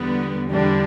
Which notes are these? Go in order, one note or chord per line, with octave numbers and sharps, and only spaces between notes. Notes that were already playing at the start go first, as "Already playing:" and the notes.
Already playing: E2 D3 G3 B3
E2 D3 G3 D4